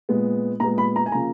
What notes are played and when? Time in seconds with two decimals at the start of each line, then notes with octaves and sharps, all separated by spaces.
0.09 A#2 G#3 B3
0.60 A#2 G#3 B3 A#5
0.78 B5
0.96 A#5
1.06 G#5
1.12 C#3 F3 A#3 A#5